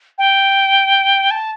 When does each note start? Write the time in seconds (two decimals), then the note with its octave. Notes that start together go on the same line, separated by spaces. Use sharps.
0.18 G5
1.31 A5